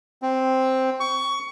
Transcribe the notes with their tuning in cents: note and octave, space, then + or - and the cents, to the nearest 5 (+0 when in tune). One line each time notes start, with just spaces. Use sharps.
C4 +0
C#6 +20